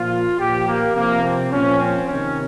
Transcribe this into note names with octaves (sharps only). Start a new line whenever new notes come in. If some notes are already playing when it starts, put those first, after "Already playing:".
Already playing: A#2 F3 F4
A#2 F3 G4
A#3
C3 F3 A#3
C4
A#2 F3 C#4
C4
C3 D#3 C#4